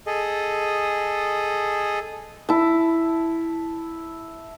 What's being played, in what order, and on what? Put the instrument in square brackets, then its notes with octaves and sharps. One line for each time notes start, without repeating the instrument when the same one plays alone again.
[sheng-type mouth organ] G#4 A4 D#5
[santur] E4 A5